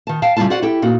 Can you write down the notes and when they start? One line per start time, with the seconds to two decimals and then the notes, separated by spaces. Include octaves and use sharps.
0.07 D#3 A5
0.22 F5 G5 A5
0.37 C#3 G3 C#4 E4 F4 A5
0.50 F4 F#4 C5 D5 F#5
0.62 E4 G4 A4 G5
0.82 A#2 D#4 F#4